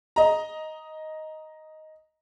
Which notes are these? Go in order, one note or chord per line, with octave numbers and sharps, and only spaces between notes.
D#5 A#5